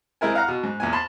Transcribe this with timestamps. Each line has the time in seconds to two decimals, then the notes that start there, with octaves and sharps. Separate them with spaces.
0.21 G#3 C4 E4 A#4 G#5
0.35 F5 F#5 A#5 F6
0.48 B2
0.63 G#2
0.80 E2 A#2 G#5
0.93 A5 B5 C6